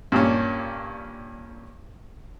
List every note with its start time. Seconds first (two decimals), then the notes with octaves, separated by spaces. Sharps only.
0.12 G2 A#2 C#4